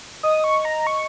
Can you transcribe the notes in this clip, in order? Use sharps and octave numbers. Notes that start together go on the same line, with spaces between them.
D#5 D#6
C#6
A#5
C#6